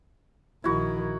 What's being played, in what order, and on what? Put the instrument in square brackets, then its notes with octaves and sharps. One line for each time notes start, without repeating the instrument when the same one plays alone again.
[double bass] A#1 D#3 [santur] E4 F#4